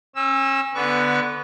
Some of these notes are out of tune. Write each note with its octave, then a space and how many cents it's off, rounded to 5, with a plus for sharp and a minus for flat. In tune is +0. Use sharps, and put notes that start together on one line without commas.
C#4 -35 E6 +0
D3 +0 B3 +0 C#6 +30